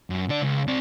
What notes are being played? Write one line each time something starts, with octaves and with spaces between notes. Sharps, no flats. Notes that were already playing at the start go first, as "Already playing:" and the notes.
F#2
D3 D5
C#2
C4 D5